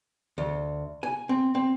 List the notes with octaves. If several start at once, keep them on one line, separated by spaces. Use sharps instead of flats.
D2
G#5
C4
C4